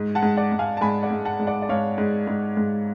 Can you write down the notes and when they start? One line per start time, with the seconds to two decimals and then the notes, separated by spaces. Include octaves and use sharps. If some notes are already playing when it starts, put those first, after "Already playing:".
Already playing: G#2
0.15 F#5 A5
0.23 G#2
0.37 D5 F#5
0.52 G#2
0.59 F5 G#5
0.77 A5
0.81 G#2 G#5 B5
1.03 D5 F#5
1.11 G#2
1.25 F#5 A5
1.40 G#2
1.47 D5 F#5
1.62 D5
1.69 G#2 C#5 F5
1.98 G#2
2.27 G#2
2.57 G#2